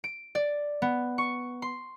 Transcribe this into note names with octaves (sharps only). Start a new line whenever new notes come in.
D7
D5
B3
C#6
C6